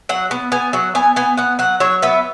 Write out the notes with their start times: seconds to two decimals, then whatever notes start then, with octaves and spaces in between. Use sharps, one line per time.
0.09 F#3 F#5
0.31 B3
0.52 B3 G#5
0.73 F#3 F#5
0.95 B3 G#5
1.16 B3 G#5
1.37 B3 F#5
1.59 F#3 F#5
1.80 F#3 C#5
2.02 B3 E5